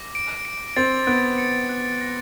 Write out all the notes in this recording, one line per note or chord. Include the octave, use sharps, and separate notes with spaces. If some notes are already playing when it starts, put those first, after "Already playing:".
Already playing: D6 A#6
D7
D7
C4 A6
B3 D7
C#7
F#6
A#6